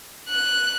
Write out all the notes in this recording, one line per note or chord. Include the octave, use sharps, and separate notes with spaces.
F#6